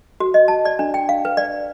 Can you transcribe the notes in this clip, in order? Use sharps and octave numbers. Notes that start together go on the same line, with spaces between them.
F#4
D#5
A5
D5
D4
G5
F5
B4
D5